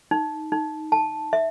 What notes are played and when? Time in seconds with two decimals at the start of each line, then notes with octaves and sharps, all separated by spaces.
0.11 D#4
0.52 D#4
0.92 A5
1.33 E5